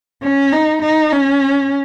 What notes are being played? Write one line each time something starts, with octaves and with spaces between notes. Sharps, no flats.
C#4
D#4
D#4
C#4